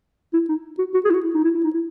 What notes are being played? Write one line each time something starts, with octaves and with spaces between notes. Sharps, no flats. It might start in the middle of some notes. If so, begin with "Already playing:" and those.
E4
D#4
F#4
F#4
G#4
E4
F#4
E4
D#4
E4
E4
D#4
E4